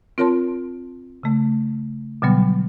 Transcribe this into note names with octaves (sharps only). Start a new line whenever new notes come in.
C4 F4 A#4 C#5 A5 C6
C#3 A3
B2 D3 F#3 G3 B3